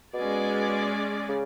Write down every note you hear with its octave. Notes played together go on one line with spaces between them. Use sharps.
B2 G#3 C#4 G#4 D5
C#3